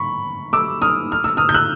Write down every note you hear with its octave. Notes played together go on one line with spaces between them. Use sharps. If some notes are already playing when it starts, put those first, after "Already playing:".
Already playing: B5 C#6
D6 E6
D#6 F6
F6
E6
D#6 F6
G6
E6 F#6